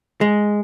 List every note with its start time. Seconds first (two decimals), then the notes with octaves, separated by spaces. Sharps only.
0.21 G#3